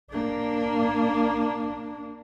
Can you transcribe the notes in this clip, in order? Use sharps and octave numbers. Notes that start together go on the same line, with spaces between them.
A#3 D4